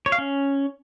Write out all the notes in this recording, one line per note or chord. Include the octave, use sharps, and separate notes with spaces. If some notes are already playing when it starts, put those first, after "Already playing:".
C#5
F5
C#4